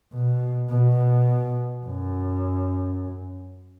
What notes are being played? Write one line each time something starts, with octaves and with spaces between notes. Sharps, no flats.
B2
B2
F#2